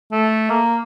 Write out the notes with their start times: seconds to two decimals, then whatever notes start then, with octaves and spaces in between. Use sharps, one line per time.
0.12 A3
0.50 A#3